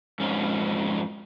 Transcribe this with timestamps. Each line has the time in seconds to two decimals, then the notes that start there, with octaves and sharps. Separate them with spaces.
0.20 F2 G#2 C#4